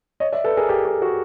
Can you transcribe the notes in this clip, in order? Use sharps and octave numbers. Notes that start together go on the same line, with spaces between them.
C#5 D#5
D5 E5
A4 B4
G#4 A#4
G4 A4
G4 A4
F#4 G#4